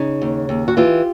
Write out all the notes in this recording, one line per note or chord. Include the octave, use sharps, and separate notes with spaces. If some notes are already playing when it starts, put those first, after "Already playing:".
Already playing: C#3 C#4 D#4
D#2
D#2
F#4
E3 F4 G4